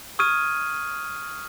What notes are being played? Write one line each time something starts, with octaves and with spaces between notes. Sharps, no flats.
C#6 D#6 F6 G#6 D#7